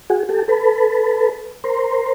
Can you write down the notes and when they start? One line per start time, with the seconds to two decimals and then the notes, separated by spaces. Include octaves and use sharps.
0.10 F#4 G#4
0.29 G4 A4
0.48 A4 B4
1.64 A#4 C5